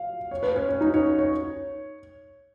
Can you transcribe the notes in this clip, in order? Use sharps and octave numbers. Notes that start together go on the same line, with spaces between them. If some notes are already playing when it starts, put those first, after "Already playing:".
Already playing: F5
C#5
B4
C#4
C#4
D#4
C#5
C#5